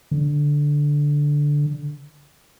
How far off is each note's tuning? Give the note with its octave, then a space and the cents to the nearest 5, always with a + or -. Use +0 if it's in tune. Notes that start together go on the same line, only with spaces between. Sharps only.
D3 -5